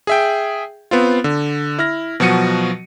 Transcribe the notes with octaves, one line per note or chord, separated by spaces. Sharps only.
G#4 E5 G5
B3 C4 F4
D3
E4 F6 A#6
B2 F3 F#3 F#4 C#7 D#7